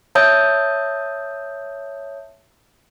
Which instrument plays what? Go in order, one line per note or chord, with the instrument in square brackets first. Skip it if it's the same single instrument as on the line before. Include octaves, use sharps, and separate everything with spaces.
[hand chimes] C#5 E5 A5 D#6 G6